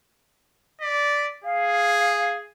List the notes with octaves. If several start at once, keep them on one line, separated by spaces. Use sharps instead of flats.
D5 B6
G#4 F5